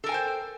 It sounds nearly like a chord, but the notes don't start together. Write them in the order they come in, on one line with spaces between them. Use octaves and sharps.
A4 A#4 G#5 G5 C5